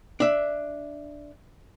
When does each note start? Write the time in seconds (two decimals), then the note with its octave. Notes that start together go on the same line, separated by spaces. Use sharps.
0.20 D4 E5